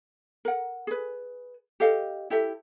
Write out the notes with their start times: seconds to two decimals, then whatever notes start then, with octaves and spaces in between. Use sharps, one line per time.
0.45 A#4 F#5
0.87 G#4 B4
1.80 G4 A4 D#5 F5
2.30 E4 G4 A4 E5